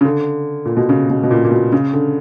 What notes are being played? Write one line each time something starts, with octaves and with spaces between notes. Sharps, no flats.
C#3
D3
A#2
B2
C#3
B2
B2
A#2
A#2
B2
C#3
D3